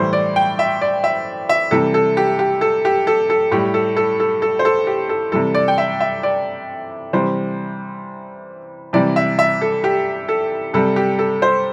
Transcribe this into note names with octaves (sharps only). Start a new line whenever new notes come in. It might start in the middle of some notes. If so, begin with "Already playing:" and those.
Already playing: A2 E3 G3 C5
D5
G5
E5
D5
E5
E5
C3 E3 G3 A4
A4
G4
G4
A4
G4
A4
A4
A2 G3 G4
A4
A4
A4
A4
C5
A4
G4
A4
C3 E3 G3 A4
D5
G5
E5
E5
D5
C3 E3 G3 C5
C3 E3 G3 D5
E5
E5
A4
G4
A4
C3 G3 A4
G4
A4
C5